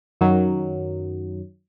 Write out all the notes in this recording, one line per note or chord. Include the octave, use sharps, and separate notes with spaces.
F#2 D#3 F#3